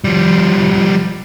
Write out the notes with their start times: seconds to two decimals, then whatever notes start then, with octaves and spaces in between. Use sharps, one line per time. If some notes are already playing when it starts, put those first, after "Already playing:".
0.04 F3 G3